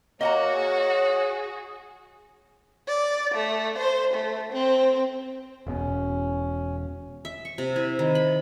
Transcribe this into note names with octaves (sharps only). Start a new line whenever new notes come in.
A#3 F#4 C#5 D#5 F#5 A#5
G#4
D5
A3
C5
A3
C4
E1 B2 C#4
E5
C#6
C3
E4
D#3
B5